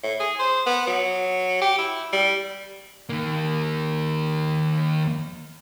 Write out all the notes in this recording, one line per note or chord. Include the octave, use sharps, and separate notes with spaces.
A2
G#4
C5
B3
F#3
G4
E4
G3
D#3 A#3